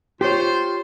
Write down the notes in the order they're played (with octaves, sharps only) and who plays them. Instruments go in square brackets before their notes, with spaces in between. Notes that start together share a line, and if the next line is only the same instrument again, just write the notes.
[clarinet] F4 [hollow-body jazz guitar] G4 C#5 [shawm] C5